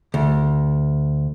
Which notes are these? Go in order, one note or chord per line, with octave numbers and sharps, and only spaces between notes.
D2